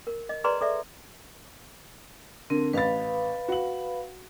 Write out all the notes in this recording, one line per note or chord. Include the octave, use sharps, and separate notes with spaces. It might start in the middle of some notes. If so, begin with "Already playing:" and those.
A#4
D#5
G#4 B4 D5 A#5 C6
A4 D5 E5
D3 C4 A#4
A1 B4 F5 B5 A6
F#4 F#7